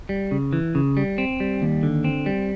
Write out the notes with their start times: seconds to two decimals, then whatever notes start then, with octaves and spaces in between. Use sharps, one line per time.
0.09 G3
0.31 C#3
0.53 E3
0.75 C#3
0.97 G3
1.18 C4
1.40 G3
1.62 D#2
1.83 D3
2.04 C4
2.26 G3